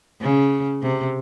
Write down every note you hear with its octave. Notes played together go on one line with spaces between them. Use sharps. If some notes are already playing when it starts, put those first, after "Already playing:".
C#3
C3